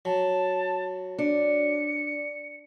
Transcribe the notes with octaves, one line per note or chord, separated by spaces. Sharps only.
F#3 A5
D4 C#7